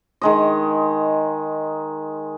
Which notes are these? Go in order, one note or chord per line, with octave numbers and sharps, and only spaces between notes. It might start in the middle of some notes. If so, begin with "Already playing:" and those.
D#3 G#3 D#5